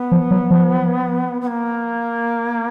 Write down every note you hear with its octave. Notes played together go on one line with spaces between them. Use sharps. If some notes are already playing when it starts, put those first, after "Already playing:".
Already playing: B3
F3
F#3
F3
B3
A#3